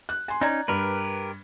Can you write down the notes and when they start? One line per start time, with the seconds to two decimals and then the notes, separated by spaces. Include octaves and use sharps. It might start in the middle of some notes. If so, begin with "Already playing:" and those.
0.09 F#6
0.28 G#5 C6
0.41 C#4 D#4 D5 A#5 G#6
0.68 G2 G4 A#4 B4